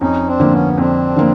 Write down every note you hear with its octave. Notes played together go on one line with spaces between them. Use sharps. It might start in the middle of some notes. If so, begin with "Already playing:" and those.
F2 C#4 D#4
C4 D4
D3 F3 A#3
B3 C#4
C#4
F2 C4 D4
D3 F3 A#3